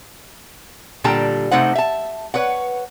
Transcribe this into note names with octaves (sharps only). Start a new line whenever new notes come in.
A#2 D3 G3 G5 A5 A#5
C3 A3 D#4 C5 F#5
E5 A5
B4 C#5 F#5